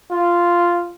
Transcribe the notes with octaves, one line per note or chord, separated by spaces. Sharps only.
F4